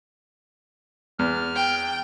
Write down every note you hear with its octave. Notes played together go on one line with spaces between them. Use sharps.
E2 F6
G5